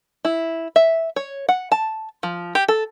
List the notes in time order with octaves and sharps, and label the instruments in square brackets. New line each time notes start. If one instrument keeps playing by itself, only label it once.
[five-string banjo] E4
E5
C#5
F#5
A5
F3
G4
A4